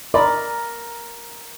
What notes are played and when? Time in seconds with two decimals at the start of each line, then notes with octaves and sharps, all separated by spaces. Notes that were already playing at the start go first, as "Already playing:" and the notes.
0.14 A#4 D5 D#5 B5